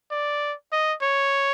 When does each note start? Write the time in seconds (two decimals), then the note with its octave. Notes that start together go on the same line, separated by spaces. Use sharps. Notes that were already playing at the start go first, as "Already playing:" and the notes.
0.11 D5
0.72 D#5
1.03 C#5